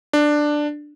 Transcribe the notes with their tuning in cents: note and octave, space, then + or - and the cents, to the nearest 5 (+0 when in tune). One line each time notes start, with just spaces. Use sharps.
D4 +10